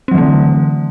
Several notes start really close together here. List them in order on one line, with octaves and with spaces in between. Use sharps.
C4 F#3 E3 A3 D3